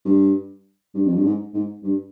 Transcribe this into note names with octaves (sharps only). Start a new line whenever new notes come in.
G2
G2
F2
G2
G#2
G#2
G2